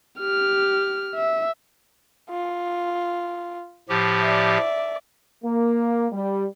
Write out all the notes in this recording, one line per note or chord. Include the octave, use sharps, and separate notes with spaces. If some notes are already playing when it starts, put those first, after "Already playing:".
G4 F6
E5
F4
A2 F3 G4
D5 E5
A#3
G3